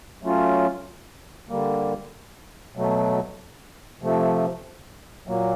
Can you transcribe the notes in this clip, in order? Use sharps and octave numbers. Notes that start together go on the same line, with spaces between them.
F#3 A3 C#4 F4
D3 G3 A#3
B2 F#3 A3
C3 F3 A3
A#2 F#3 A#3